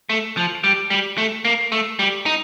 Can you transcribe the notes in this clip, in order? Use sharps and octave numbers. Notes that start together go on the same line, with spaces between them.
A3
F3
G3
G3
A3
A#3
A3
G3
D#4